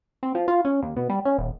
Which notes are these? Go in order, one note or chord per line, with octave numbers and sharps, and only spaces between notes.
C4
F3
F4
C#4
D#2
B2
G3
C#4
D#1